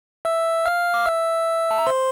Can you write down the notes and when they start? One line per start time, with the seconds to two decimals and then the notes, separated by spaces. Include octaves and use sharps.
0.25 E5 E6
0.66 F5 F6
0.94 D6
1.06 E5 E6
1.71 A5
1.78 A#5
1.86 C5 C6